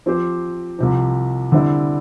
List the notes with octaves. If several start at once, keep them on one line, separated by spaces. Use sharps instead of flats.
F3 C4 G4 C5
C2 C3 F3
D3 G3 C4 E4